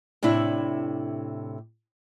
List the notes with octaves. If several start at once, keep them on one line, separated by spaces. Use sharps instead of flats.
A2 C3 D4 E4